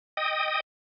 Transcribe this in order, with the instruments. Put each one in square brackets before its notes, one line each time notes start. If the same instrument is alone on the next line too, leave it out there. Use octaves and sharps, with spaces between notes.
[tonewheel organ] D#5 G5 D#6